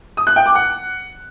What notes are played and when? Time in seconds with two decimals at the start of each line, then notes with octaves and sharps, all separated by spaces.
0.17 D#6
0.27 F#6
0.36 G5
0.46 D6
0.55 F#5